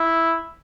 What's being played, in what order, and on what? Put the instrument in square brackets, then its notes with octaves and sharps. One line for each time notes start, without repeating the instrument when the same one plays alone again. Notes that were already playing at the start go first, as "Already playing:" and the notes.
Already playing: [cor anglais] E4